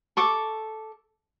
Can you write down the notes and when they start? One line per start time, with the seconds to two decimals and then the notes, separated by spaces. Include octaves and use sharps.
0.17 A4 C#6 D6